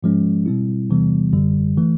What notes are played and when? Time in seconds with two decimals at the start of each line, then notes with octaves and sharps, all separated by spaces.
0.03 G#2 F3 G#3 C#4
0.46 B2 G3 C4 E4
0.89 E2 C3 E3 G3 B3
1.33 G#1 F#2 D3 G3
1.77 E3 A3